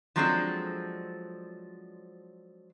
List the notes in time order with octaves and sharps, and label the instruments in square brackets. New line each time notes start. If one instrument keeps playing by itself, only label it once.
[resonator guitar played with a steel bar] F3 F#3 G#3 C4 D4 A4